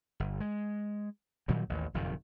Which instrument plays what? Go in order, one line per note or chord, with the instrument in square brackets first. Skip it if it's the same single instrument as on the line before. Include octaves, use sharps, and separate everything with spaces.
[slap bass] G1
G#3
A#2 D#3 F#3 G3
A1 D#2
F#1 F2 A#2 D#3